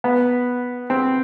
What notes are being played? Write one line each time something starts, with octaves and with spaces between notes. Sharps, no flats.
B3
C4